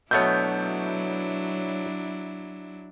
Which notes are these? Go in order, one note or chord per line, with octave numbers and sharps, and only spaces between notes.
B2 F#3 A3 B3 D4 E4 C#5 G6